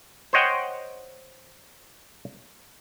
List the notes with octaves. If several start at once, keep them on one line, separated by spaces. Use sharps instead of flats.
C5 C#5 D#5 F#5 G5